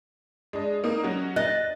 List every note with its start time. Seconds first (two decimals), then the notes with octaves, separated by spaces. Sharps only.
0.53 G#3 D4 D#5
0.84 A#3 D#4 D#6
1.04 F#3 C#4 F#4
1.36 D#5 F#6 A6